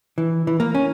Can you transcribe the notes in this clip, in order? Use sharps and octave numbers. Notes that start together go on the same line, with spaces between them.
E3
E3
A#3
C#4